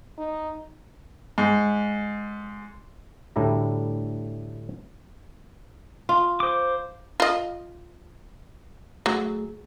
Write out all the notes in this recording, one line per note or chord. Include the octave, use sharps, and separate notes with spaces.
D#4
G#2
D2 A2 G3 D4 E4 A#5
F4
C5 D6
F4 D#5
F#3 A3 G#4